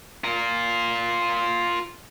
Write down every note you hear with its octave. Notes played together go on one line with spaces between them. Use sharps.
F4 A#4